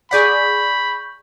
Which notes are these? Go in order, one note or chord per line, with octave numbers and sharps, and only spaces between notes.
G#4 D5 F#5 B5 C#6 G6 B6